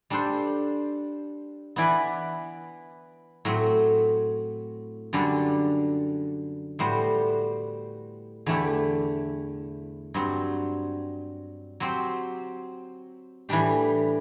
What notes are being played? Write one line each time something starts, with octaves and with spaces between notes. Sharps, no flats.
G3 D4 A4 C5
E3 B3 E4 B4 D5
A2 F#3 C4
F#2 D3 G3 D4 A4
A2 G3 B3 F#4 C5
E2 D3 A3 E4 G4
G2 F#3 C4
F#3 C4 G4 C5
A2 E3 G3 D4 G4